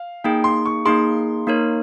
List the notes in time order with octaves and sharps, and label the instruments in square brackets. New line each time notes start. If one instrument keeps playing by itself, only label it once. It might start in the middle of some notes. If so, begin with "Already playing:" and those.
Already playing: [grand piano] F5
[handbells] A#3 D#4 G#4 [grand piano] G5
[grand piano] C6
C#6
[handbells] A#3 D#4 G#4 [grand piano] C6
[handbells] A#3 D#4 A#4 C#5